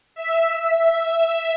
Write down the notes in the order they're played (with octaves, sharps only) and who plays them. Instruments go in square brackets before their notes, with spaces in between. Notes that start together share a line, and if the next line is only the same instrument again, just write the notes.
[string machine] E5